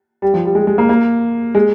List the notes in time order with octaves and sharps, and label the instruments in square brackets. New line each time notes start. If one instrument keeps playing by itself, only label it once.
[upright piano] G3
F3
G3
G#3
G#3
A#3
A#3
G#3